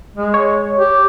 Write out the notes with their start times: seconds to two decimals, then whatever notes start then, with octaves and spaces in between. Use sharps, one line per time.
0.16 G#3
0.34 C#5
0.79 G4